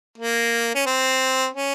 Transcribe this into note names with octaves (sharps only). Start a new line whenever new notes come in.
A#3
C#4
C4
C#4